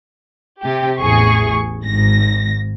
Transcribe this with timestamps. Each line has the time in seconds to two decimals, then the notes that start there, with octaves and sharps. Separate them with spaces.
0.61 C3 G4
1.00 A1 E2 G#4 C#6
1.81 G#1 G#2 A#6